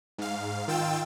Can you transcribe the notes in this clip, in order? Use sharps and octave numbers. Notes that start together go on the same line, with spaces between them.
G#2 F5
D#3 F4 G5 E6 A6